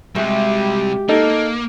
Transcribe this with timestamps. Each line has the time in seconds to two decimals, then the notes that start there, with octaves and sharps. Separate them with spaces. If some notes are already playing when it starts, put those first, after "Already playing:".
0.15 C3 G3 G#3 F#4 G4 E5
1.09 A#3 D#4 A4